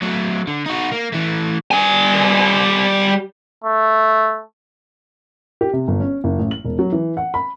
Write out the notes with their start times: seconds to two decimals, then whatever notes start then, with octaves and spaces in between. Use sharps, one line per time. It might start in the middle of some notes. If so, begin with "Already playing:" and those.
0.02 F#3 A3
0.47 D3
0.66 D#4 F#4
0.91 A#3
1.12 E3 A3
1.71 G3 G#5
3.64 A3
5.61 G4
5.73 C3
5.88 G1
6.00 C#4
6.24 F#1
6.39 A1
6.51 F#7
6.64 E1
6.79 F#3
6.92 E3
7.17 F#5
7.34 B5